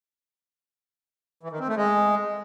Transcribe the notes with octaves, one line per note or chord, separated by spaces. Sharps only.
E3
D#3
C4
A3
G#3